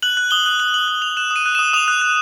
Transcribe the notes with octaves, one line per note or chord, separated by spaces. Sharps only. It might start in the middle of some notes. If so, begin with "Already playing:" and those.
F#6 F#7
F#6
D#6 G7
F#6
F#6 F#7
F#6 F#7
F#6 F#7
F#6 F7
F#6 E7
D#6 D#7
F#6
D#6 E7
D#6 F7
F#6
F#6